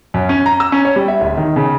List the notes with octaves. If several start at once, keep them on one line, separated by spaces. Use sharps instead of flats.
F#2
C#4
A#5
E6
C#4
C#5
G3
E5
D1
D#3
C#3